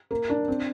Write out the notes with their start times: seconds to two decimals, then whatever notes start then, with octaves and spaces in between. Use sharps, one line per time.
0.11 A#3
0.30 D4
0.48 C4